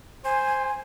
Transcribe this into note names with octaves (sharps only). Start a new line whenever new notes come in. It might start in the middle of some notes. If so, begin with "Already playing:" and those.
C5 G#5